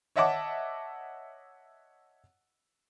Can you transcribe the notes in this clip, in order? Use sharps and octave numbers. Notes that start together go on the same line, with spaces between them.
C#5 D#5 E5 F#5 A5 D6